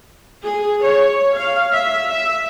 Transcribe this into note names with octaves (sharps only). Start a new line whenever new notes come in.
G#4
C#5
F5
E5
E5